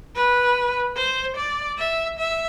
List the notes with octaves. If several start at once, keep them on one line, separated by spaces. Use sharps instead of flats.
B4
C5
D5
E5
E5